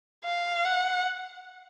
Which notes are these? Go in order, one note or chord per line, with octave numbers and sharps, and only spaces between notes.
F5
F#5